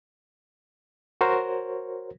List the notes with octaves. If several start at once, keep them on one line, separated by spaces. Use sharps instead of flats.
F#4 A#4 C5 C#5